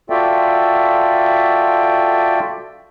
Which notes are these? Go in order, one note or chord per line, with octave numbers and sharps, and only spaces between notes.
F4 F#4 A4 D5 E5 G5